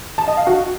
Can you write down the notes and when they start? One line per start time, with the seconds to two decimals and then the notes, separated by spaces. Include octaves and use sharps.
0.18 A5
0.28 D#5
0.37 F5
0.47 F#4